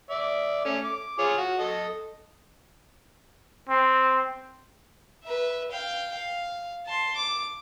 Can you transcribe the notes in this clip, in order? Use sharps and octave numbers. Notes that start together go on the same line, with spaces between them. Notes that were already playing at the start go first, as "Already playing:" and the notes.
D5 E5
A3 C#4
D6
F4 G#4 C#5
F#4
A4 D#5
C4
B4 E5
F5 G5
F5
A5 C6
D6